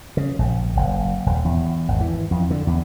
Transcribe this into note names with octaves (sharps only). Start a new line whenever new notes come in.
C#3
A#1
F#1
D#1
E2
G#1
E3
F2
D3
E2